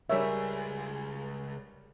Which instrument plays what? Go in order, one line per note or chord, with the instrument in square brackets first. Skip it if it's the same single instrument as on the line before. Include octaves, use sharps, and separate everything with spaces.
[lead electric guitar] C#2 G#4 [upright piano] G3 A#4 C#5 [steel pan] E5